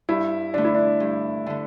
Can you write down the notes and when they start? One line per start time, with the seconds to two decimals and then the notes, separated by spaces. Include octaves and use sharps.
0.09 G2 E4
0.54 D3 A3 D4
0.65 E4
0.74 D4
1.00 G2
1.46 D3 A3